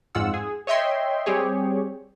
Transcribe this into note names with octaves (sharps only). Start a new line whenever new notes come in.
F2 G#2 F4 F#5 E6
G#4
C#5 D#5 E5 G5 C6
G3 C4 G4 G#4 C#5